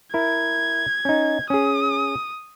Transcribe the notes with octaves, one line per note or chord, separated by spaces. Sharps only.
E4 A#4 G#6
C#4 D#4
C#4 G#4 D#6